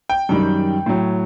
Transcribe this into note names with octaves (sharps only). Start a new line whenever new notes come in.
G5
F#2 D#3 G3
A2 F#3